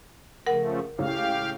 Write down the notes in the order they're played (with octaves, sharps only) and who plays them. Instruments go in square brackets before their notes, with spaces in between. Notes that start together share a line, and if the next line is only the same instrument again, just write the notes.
[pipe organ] C#3 F3 A3 [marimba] A#4 F#5
[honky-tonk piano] C#2 A2 C#3 [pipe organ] G4 F5